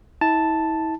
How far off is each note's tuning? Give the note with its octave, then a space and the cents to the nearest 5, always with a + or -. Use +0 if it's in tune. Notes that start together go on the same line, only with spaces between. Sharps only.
E4 -40 A5 +0